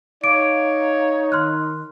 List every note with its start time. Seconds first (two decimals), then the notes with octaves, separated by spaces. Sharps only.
0.24 D#4 C#5 F5 D6 D7
1.32 D#3 C6 F6 F#6